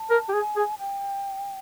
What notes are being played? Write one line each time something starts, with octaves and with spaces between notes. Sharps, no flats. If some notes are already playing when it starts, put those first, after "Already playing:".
Already playing: A5
A#4
G4
G#4 G#5
G#4
G5